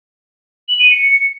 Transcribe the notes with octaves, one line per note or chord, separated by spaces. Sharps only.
F#7
D#7
C#7